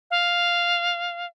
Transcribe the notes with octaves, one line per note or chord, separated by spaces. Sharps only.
F5